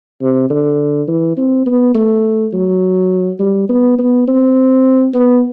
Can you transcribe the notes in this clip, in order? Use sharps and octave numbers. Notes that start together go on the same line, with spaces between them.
C3
D3
E3
C4
B3
A3
F#3
G3
B3
B3
C4
B3